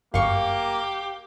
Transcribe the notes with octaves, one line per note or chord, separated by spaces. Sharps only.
G1 F#2 A#3 G4 F5 C#6